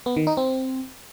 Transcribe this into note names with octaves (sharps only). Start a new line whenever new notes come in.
B3
D#3
D#4
C4